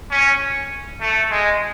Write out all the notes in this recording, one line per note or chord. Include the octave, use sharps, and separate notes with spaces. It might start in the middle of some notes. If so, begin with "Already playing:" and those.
C#4
A3
G#3